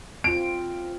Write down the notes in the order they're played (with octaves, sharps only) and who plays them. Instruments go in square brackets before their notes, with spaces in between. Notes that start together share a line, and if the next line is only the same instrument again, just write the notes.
[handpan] C4 F4 [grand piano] D7